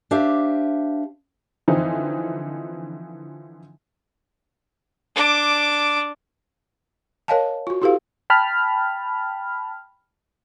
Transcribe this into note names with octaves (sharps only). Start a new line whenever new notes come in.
D4 G4 C5 E5 F5
D3 E3 F3 C4 D#4
D4 D6
A#4 C#5 D#5 F5 G#5 A5
F4 F#4
E4 F#4 G4 A4 B4 F5
G5 A5 B5 F6